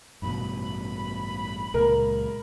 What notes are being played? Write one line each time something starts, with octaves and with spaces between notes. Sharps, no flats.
A1 G2 B2 B5
C#2 A#2 G#3 A#4